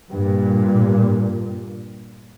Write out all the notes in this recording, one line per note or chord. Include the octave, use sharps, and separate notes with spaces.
G2 A#2